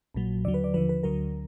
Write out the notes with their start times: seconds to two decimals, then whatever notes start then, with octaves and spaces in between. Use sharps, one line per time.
0.15 A#1 A#2 F#3
0.45 D#2 D3 F#3 D5
0.54 B4
0.64 D5
0.74 D#2 D3 F3 B4
0.89 B4
1.03 D2 D3 F#3 A#4